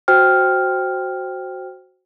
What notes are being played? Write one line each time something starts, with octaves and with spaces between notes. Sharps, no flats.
F#4 C5 G5 F6